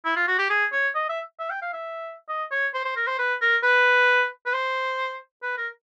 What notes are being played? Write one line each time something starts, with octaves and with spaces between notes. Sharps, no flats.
E4
F4
F#4
G4
G#4
C#5
D#5
E5
E5
G5
F5
E5
D#5
C#5
C5
C5
A#4
C5
B4
A#4
B4
B4
C5
B4
A#4